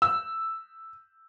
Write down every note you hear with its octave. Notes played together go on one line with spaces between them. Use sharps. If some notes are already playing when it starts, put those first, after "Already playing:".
E6